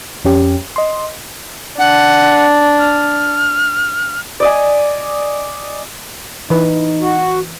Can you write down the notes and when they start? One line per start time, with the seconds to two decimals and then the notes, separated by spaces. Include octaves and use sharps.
0.25 F2 C#4 G4
0.76 D#5 C6
1.79 D4 F#5
2.79 F6
4.40 D5 D#5 G#5
6.50 E3 D#4 B4
7.01 F#4